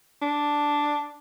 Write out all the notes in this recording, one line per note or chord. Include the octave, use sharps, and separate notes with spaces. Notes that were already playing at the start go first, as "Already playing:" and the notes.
D4